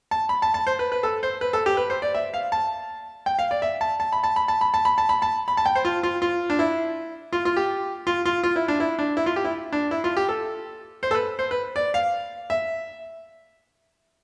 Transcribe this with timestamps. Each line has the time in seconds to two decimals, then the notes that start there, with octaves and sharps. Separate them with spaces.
0.11 A5
0.29 B5
0.42 A5
0.54 A5
0.67 C5
0.79 B4
0.92 B4
1.03 A4
1.23 C5
1.41 B4
1.53 A4
1.66 G4
1.77 B4
1.90 C5
2.02 D5
2.15 E5
2.34 F5
2.52 A5
3.26 G5
3.39 F5
3.51 D5
3.62 E5
3.81 A5
4.00 A5
4.12 B5
4.24 A5
4.36 B5
4.48 A5
4.61 B5
4.74 A5
4.85 B5
4.98 A5
5.09 B5
5.22 A5
5.48 B5
5.57 A5
5.66 G5
5.75 C5
5.85 F4
6.03 F4
6.22 F4
6.50 D4
6.59 E4
7.33 F4
7.45 F4
7.57 G4
8.07 F4
8.25 F4
8.43 F4
8.56 E4
8.68 D4
8.80 E4
8.99 D4
9.17 E4
9.26 F4
9.36 G4
9.45 E4
9.73 D4
9.91 E4
10.04 F4
10.17 G4
10.29 A4
11.03 C5
11.11 A4
11.15 B4
11.39 C5
11.51 B4
11.76 D5
11.94 F5
12.50 E5